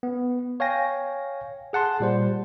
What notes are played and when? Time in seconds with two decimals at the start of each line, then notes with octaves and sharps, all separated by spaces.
0.03 B3
0.60 C#5 F5 G5 G#5 A#6
1.73 G#4 F#5 A5 C6
2.00 A#2 G3 C5